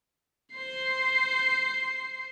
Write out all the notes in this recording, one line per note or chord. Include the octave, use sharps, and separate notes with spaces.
C5 C7